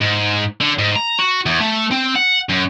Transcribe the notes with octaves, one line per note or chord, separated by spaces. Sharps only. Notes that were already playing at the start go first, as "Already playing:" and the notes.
G#2
D3
G#2
A#5
F#4
E2
A3
C4
F#5
F#2